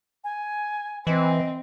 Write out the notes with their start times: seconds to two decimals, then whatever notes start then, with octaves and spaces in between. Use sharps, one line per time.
0.24 G#5
1.07 E3 C4 D#5